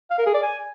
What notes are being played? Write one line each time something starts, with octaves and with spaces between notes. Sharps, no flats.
F5
A#4
G#4
D5
G#5